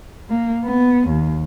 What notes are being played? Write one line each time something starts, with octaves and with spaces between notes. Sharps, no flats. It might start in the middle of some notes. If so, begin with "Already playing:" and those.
A#3
B3
D#2